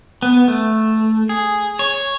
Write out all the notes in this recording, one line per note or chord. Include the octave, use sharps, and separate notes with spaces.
B3
A3
G#4
C#5